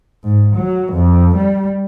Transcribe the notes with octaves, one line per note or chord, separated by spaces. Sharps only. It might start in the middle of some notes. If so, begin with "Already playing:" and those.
G#2
F#3
F2
G3